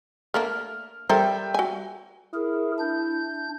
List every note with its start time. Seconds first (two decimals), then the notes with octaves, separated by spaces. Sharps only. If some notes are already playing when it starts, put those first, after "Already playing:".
0.34 A3 A#3 D4 F6
1.09 G3 A4 A#4 C5 E5 G5
1.54 F#4 G#5
2.34 E4 G#4 A#4
2.79 D4 G6